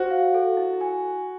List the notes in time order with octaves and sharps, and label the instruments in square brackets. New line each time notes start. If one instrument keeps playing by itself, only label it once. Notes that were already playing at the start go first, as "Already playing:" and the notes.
Already playing: [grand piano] F#4 [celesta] C5
[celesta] F5
A4
E4
G#5